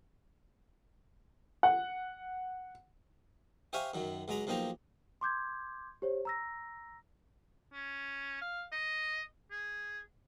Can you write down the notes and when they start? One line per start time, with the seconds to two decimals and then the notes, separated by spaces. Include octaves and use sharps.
1.63 F#5
3.73 G4 C5 C#5 E5 F5 G#5
3.94 F#2 D#3 F#3
4.28 C#2 F#3 G#3 A#5 B5
4.47 B1 F3 A#3 D#4 G4 A#5
5.21 C6 D6 G6 G#6
6.02 G4 C5 C#5
6.25 A#5 E6 A#6
7.72 C#4
8.41 F5
8.72 D#5
9.51 G#4